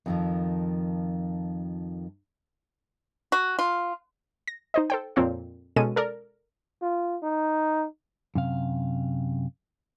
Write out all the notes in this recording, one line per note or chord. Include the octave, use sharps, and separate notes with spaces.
F2 D#3 F3
F#4
F4
A#6
D#4 C5 D#5
A4 C5 G5
F2 A#2 C4 C#5 F5
B2 G#3 C#4 A4 A5 D#7
A4 A#4 D5
F4
D#4
F#2 C3 F5